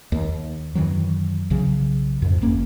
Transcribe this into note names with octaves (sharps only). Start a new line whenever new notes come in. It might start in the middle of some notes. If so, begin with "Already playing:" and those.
D#2
F#2 D#3 E3 F#3
B1 C#3 F#3
F2 G#2
G1 A#3 C#4